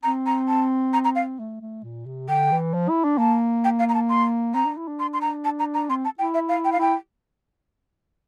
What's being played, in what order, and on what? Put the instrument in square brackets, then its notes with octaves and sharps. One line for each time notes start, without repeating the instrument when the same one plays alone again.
[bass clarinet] C4 [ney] A#5
[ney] A#5
A5
A#5
A#5
F5
[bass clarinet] A3
A3
A#2
C3
[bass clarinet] D3 [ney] G5
[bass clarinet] E3
F3
E4
D4
[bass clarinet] A#3 [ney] A5
[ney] G5
F5
A#5
A5
C6
[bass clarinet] C4 [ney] A#5
[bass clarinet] D4
E4
D4
[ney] C6
C6
A#5
A5
A#5
A#5
[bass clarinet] C4 [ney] C6
[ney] A5
[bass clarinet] E4 [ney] G5
[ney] E5
F5
G5
F5
[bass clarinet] E4 [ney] G5